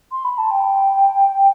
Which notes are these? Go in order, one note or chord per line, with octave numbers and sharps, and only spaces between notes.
C6
B5
A5
G5